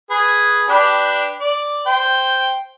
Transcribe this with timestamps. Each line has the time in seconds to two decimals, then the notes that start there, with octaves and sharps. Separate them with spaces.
0.10 G#4 B4
0.69 D4 G4 B4
1.41 D5
1.86 C5 G5